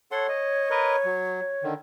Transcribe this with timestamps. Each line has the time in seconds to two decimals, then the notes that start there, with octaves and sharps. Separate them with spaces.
0.11 A4 C#5 F#5 C6
0.29 D#5
0.70 A#4 B4 D#5
1.05 F#3
1.63 D3 D#3